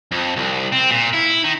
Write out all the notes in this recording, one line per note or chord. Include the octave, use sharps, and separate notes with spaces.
F2
C2
C4
A#2
E4
D#3